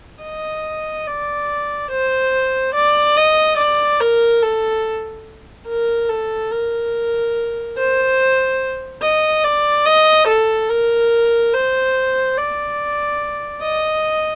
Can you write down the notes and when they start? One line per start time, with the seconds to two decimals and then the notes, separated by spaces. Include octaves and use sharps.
0.23 D#5
1.07 D5
1.91 C5
2.75 D5
3.17 D#5
3.58 D5
4.01 A#4
4.42 A4
5.68 A#4
6.09 A4
6.51 A#4
7.77 C5
9.02 D#5
9.44 D5
9.86 D#5
10.28 A4
10.69 A#4
11.54 C5
12.37 D5
13.62 D#5